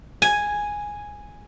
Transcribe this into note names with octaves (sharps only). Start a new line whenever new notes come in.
G#5